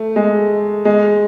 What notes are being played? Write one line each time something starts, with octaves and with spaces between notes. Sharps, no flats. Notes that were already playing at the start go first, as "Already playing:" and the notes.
Already playing: A3
G#3
G#3